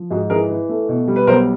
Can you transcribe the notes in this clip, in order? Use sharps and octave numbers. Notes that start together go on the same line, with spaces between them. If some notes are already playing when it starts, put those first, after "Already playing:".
Already playing: F3
G#2 F#4 G#4
E3 G#4 A#4
E3
A3
B2
G3
B4
B1 A#4 C5